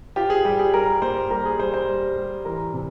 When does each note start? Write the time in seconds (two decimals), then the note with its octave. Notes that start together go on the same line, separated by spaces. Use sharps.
0.16 F4 G4
0.30 G#4
0.45 G3 G4
0.59 G#4
0.74 G3 A#4
1.02 A#3 C5
1.31 G3 A#4
1.45 G#4
1.60 G3 C5
1.74 C5
1.88 G3
2.17 G3
2.45 E3 A#4
2.74 C3